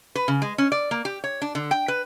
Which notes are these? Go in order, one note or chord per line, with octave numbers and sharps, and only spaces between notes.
B4
C#3
G#3
C#4
D5
A#3
G4
C#5
D4
D3
G5
B4